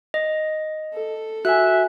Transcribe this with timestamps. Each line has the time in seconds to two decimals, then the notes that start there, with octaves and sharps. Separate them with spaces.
0.14 D#5
0.93 A4
1.45 F#4 E5 G#5 F#6